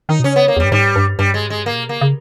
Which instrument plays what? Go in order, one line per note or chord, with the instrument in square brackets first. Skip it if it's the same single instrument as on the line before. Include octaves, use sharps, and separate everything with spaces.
[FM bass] D#3 [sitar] D#4
[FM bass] B2
[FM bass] C#3 [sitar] C#4
[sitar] B3
A#3
[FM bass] E2
[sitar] G3
[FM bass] G2
[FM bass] G#2 [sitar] G3
[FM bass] G2
[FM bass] G2 [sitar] G3
[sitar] G#3
[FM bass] G#2
[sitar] G#3
[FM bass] G2
[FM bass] G#2 [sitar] A#3
[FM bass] A#2
B2
[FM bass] C#3 [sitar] A#3
[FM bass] C#3